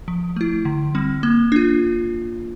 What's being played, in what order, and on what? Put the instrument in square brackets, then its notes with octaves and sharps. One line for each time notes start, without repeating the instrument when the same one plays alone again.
[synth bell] F3
A3 E4
D3
G3 C4
A#3
D4 F4